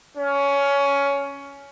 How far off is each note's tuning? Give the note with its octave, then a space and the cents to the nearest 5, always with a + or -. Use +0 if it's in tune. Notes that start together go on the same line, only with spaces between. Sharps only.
C#4 +15